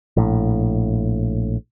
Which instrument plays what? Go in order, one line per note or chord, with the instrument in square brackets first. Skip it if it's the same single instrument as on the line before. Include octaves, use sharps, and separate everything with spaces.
[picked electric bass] A#1 A2